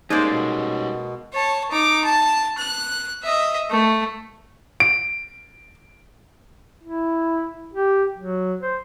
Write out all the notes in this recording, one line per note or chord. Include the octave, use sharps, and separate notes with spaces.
G3 G#3 A#3 C#4 D#4 C5 D5
B2
C#5 A5
D#4 D6
A5
F#6
D#5 E5
A3
D7
E4
G4
F#3
C5